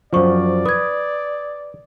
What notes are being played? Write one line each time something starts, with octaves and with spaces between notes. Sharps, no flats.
F#2 F3 C5 D5 C#6
B4 D#6 G#6